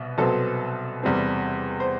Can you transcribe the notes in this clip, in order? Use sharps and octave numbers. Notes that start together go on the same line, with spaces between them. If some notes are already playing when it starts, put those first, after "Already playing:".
Already playing: C2 B2
C2 B2 F#3 C4 A4
E2 C3 G3 C4
C5